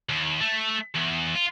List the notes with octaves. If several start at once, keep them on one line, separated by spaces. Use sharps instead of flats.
D#2
A3
E2
F4